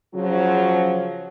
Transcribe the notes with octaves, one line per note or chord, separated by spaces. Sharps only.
C#3 F3 F#3